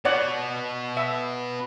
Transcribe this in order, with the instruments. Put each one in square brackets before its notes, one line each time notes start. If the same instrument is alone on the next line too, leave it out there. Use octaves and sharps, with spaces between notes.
[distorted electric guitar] B3 F#4 [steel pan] C#5 D5 F#5
[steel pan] E5